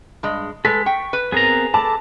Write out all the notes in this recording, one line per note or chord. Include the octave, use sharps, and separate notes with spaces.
G2 G#3
G#3 A4 B4 B6
G5 C#6
B4
B3 C4 G#4 A#4 A#5
A4 A5 B5 D6